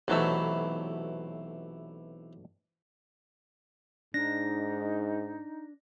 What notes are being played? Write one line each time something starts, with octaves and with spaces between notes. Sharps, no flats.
B1 C3 E3 F#3 A3 E4
G#2 D4 D#4 A#6